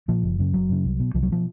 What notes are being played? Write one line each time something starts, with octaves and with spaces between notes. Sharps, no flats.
A#2 F3
F#1
F#2 C#3
F#1 F#3
F#2 C#3
C2
B2
C2 F3
F#3
B2 F3